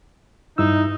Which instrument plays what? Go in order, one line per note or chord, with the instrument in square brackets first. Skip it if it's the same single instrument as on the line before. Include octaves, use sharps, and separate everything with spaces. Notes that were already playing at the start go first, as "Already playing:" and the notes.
[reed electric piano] G2 E4 E6 [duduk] D#4